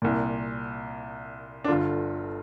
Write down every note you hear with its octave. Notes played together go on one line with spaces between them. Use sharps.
C2 A#2
D4
G1 G2 D3 F4